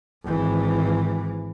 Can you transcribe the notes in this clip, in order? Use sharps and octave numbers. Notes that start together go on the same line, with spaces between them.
G#1 E3